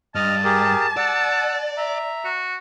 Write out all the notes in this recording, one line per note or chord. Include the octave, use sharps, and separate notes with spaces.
G2 D#5 A5 F6
G4 G#4 A#4
D5 F#5 E6
E5 A#5
F#4